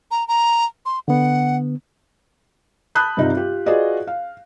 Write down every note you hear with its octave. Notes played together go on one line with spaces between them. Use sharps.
A#5
A#5
C6
D3 B3 F#5
A5 B5 D#6 F#6 G6
G2 C3 G3 D#4 F4
F4 G4
F4 F#4 G#4 B4 D5 D#5
F5